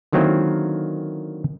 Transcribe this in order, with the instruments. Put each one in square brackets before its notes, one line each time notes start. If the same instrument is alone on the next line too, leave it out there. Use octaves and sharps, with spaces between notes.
[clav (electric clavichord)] D3 D#3 F#3 A#3 C4 E4